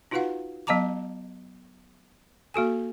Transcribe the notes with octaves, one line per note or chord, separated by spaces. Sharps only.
D#4 F4 F#4 B4 F5 F#5
F#3 B3 D#5 A5 A#5 D6
A#3 F#4 A4 G#5